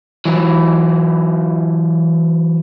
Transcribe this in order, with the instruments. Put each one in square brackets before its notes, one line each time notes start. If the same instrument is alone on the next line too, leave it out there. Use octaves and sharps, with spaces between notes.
[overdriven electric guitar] E3 F#3